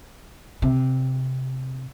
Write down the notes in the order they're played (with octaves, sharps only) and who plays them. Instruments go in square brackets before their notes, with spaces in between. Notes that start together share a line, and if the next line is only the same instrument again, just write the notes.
[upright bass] C3